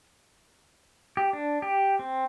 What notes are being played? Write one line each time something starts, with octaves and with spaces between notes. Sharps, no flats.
G4
D4
G4
C4